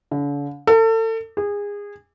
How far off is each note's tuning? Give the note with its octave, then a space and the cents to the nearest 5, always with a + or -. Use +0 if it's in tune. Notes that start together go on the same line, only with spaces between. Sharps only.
D3 -45
A4 +35
G#4 -25